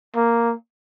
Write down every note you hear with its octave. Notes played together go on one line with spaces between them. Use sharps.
A#3